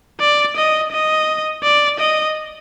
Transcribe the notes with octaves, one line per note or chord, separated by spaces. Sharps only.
D5
D#5
D#5
D5
D#5